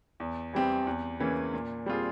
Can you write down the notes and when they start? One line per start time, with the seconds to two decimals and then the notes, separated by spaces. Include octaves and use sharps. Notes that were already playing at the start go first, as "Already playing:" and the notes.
0.20 E2
0.53 E3 G3 C4 G4
0.87 E2
1.20 C#3 E3 A#3 C#4
1.54 A#2
1.86 G3 C4 F4 G#4